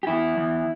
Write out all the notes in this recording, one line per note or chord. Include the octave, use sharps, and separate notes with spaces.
G4
E2 E4
E2